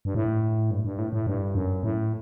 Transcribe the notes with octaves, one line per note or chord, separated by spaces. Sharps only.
G2
A2
G2
G2
A2
A2
G2
F#2
A2